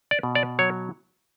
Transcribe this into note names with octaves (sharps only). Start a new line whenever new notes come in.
D5
B2
D5
F#3 C#5